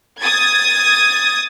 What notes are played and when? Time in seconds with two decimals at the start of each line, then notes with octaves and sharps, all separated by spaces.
0.22 D#6 G#6 A6